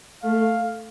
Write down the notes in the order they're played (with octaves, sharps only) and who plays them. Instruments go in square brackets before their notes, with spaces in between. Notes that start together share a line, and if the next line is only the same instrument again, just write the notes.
[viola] A3 [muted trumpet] F5